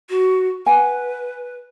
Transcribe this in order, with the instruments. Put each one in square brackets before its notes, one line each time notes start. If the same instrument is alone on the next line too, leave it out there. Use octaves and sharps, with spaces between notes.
[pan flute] F#4
[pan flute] B4 [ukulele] F#5 G#5